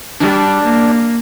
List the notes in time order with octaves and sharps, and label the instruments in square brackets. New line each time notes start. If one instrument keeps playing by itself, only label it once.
[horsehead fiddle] G3 [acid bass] D4
[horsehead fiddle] A#3